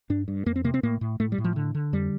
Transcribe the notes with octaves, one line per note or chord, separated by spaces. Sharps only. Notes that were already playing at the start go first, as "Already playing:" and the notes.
G2 D4
G2
F2 A#3
C4
C3 A#3
C4
A2 A#3
A2
A2 A3
G3
A2
F3
D3
D3
F2 G3